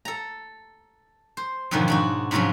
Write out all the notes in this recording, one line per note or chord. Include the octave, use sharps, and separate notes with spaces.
A4 A#5
C5
F2 G#2 B2 D3 D#3 F#3
G#2 D4 F#4
G#2 C3 F3 F#3 C#4 D4